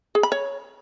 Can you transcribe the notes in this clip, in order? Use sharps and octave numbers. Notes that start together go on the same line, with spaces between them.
G#4
B5
C#5